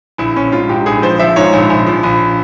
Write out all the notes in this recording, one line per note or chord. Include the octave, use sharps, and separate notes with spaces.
A#1 E4
A#1 C#4
G#2 F4
G#2 G4
A#1 G#4
F3 C5
F3 E5
G#2 C#5
A#1
A#1
F3
A#1